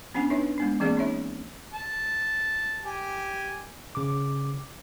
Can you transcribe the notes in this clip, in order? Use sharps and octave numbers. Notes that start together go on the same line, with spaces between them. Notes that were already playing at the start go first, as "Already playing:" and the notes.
B3 C#4 D4 F#5 G#5
D4 D#4 B4 C#5 E5
G#3 B3 D4
E3 A#3 C4 G#4 D5
C#4 D#4 C#5 E5
A5
G4 G#5
C#3 D6